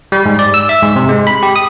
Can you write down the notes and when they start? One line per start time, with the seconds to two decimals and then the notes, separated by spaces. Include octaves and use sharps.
0.12 G3
0.26 G#2
0.39 D5
0.54 E6
0.69 E5
0.83 G#2
0.96 C3
1.09 G#3
1.27 B5
1.43 G4
1.56 D#6